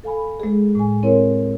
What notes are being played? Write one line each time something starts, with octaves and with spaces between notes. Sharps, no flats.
A4 F5 G#5 B5
G#3 G#4
A2 G#5
C4 E4 A#4 C#5